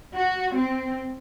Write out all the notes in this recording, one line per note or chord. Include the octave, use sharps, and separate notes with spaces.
F#4
C4